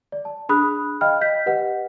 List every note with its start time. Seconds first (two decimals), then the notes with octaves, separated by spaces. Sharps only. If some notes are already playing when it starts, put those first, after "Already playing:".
0.12 D5
0.25 A5
0.49 D4 G#4 B5 D#6 F#6
1.01 D#5 F5 G5 B5 F6
1.21 D#5 G6 B6
1.46 G4 B4 D#5 F#5